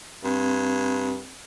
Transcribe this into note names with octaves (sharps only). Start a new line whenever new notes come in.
G2 C4